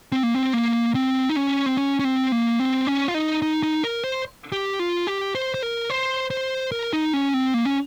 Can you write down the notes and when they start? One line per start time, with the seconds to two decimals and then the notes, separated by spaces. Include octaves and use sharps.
0.12 C4
0.23 A#3
0.35 C4
0.53 A#3
0.95 C4
1.30 D#4
1.36 C#4
1.66 C4
1.77 C#4
1.99 C#4
2.05 C4
2.32 A#3
2.60 C4
2.87 C#4
3.08 F4
3.14 D#4
3.42 D#4
3.63 D#4
3.84 A#4
4.04 C5
4.52 G4
4.79 F4
5.07 G4
5.35 C5
5.54 C5
5.63 A#4
5.90 C5
6.30 C5
6.72 A#4
6.93 D#4
7.13 C#4
7.34 C4
7.54 A#3
7.65 C#4